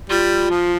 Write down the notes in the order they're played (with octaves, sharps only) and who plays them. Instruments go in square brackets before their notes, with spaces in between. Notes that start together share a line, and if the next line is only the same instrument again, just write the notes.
[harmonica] G3 [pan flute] F4
[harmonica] F3